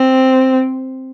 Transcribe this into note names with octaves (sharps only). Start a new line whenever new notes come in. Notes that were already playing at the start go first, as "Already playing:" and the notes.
Already playing: C4